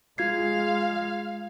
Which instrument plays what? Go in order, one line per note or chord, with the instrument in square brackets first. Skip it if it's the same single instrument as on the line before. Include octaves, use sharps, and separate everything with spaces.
[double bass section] G#3 [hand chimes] F4 G#6 C7 [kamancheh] F5